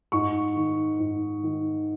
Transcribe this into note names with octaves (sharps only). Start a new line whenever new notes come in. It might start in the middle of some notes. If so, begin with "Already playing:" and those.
G#2 C#6
D#3
G#2
D#3